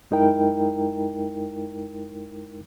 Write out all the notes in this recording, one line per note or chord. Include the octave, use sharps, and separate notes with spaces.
F#2 G#3 D#4 E4 A#4 G5